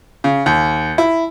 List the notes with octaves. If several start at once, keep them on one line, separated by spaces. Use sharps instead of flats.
C#3
D#2
E4